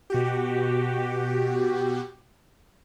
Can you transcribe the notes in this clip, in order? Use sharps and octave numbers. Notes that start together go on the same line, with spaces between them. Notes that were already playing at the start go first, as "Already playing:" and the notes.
B2 F#4 G4